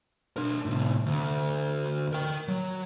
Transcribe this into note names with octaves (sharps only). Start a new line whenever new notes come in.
D4 A#4
A2 C3
D2
A#4 G5
F#3